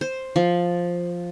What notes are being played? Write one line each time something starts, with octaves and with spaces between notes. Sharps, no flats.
C5
F3